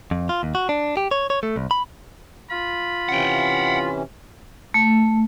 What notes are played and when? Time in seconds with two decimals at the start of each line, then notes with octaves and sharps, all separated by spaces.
0.11 F2
0.29 F4
0.43 D#2
0.55 F#4
0.69 D4
0.97 G4
1.11 C#5
1.30 C#5
1.43 A3
1.56 C2
1.71 B5
2.50 F4 B5
3.09 C3 E3 C#4 F#5 G5
4.74 A3